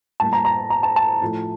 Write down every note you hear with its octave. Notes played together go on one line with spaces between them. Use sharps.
A2 G3 A#3 A5
A#5
A#5
A#5
A5
A5
A2 F3 A3